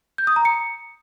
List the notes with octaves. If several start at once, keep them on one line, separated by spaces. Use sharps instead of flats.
G6
D#6
A#5
C#7